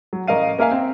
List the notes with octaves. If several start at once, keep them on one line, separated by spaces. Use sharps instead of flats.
F#3
A1 A#4 D#5 F5 D#7
A#3 A#4 E5 F5 G#5
C4